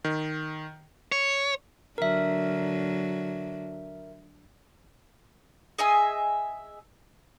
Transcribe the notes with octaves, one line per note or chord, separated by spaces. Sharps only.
D#3
C#5
D3 F#3 A#4 E5
G#4 D#5 E5 G#5